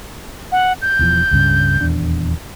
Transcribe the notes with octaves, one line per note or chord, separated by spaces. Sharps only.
F#5
G6
E1 E2 F3
C#2 G2 C#3
D#1 E2 D4